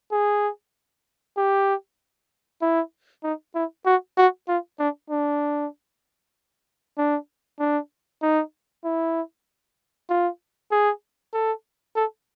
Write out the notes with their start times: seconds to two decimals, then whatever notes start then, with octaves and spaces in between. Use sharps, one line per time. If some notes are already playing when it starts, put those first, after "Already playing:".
0.12 G#4
1.37 G4
2.62 E4
3.23 D#4
3.55 E4
3.86 F#4
4.18 F#4
4.48 F4
4.79 D4
5.10 D4
6.98 D4
7.60 D4
8.23 D#4
8.84 E4
10.09 F4
10.72 G#4
11.33 A4
11.96 A4